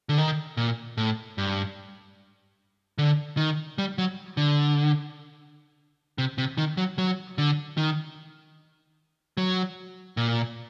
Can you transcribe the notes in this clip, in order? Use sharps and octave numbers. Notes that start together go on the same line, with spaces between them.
D3
D#3
A#2
A2
G2
D3
D#3
G3
F#3
D3
C3
C3
D#3
F#3
F#3
D3
D#3
F#3
A#2